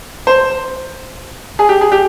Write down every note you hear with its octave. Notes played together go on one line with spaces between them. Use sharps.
C5
G#4
G4
G#4
G4